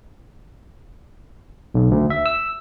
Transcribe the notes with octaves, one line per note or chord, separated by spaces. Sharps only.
B1
D2
E5
E6